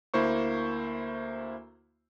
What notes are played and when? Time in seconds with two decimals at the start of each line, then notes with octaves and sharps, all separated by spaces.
0.14 D2 A#3 E4 C5 C#6